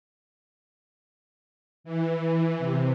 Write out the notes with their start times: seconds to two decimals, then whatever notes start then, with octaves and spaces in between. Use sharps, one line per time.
1.84 E3
2.59 C3